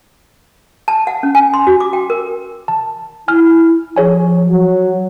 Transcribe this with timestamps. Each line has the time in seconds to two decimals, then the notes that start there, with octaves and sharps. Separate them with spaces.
0.88 A5
1.07 F#5
1.23 C#4
1.35 G#5
1.54 C6
1.67 F#4
1.80 D6
1.93 G5
2.10 A#4
2.68 A5
3.28 E4 G#5 F6
3.96 F3 G#4 C#5 G#5
4.48 F#3